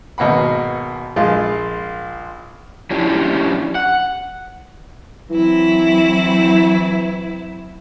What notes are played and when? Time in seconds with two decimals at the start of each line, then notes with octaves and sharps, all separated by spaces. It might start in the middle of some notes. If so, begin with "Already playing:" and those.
0.18 G#1 B2 A#3 F#5 B5
1.16 A#1 G#3 F4
2.90 F3 C#4 D4 E4 G4
3.75 F#5
5.30 E3 F#3 C4 E4